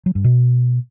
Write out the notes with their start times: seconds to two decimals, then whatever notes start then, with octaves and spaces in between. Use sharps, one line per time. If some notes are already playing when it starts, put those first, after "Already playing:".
0.06 F#3
0.15 G2
0.24 B2